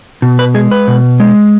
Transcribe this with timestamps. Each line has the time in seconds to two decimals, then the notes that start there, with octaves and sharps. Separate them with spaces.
0.22 B2
0.39 B4
0.54 G#3 G#4
0.71 B4
0.87 B2
1.20 G#3